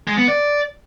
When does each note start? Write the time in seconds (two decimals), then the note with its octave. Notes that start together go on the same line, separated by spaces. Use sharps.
0.07 G#3
0.18 B3
0.28 D5